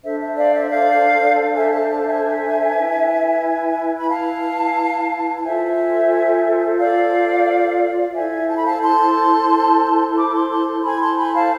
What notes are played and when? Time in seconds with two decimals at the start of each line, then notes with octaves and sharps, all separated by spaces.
0.03 D4 A4 C5 E5
0.20 E5
0.37 D5 F5
0.54 E5
0.71 D5 F5
1.55 E5 G#5
1.72 F5 A5
1.89 F5 A5
2.06 E5 G#5
2.74 E4 B4
3.98 B5
4.09 F5 A5
5.38 A5
5.44 F4 A4 C5 E5 G#5
6.79 D5 F5
8.14 E4 A4 C5 E5 G#5
8.48 A5
8.57 B5
8.65 F5 A5
8.81 A5 C6
10.17 B5 D6
10.28 B5
10.34 A5 C6
10.50 A5 C6
10.84 E4 A4 C5 G#5 B5
11.01 A5 C6
11.18 G#5 B5
11.35 F5 A5